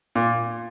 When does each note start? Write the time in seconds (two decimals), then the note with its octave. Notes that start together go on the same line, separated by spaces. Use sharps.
0.15 A#2